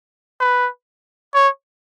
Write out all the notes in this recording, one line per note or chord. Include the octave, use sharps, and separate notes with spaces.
B4
C#5